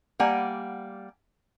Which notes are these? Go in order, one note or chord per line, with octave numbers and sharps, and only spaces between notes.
G3 A#3 F#5 G#5